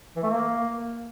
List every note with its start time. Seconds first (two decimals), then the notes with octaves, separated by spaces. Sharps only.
0.16 E3
0.23 A3
0.30 A#3